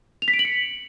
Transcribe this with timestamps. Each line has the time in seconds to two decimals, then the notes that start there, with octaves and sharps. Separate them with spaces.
0.22 F7
0.28 B6
0.34 D7
0.39 F#7
0.45 C#7